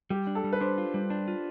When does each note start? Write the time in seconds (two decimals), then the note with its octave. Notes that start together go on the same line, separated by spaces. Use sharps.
0.10 G3 G4
0.27 D4
0.35 A4
0.44 G3
0.52 B4
0.60 D4 C5
0.78 F4
0.94 G3
1.10 D4
1.28 F4